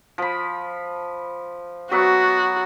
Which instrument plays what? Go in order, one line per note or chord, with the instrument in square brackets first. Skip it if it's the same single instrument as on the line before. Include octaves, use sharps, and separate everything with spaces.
[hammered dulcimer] F3 B5
[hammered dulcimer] F#3 B3 E5 [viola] F#4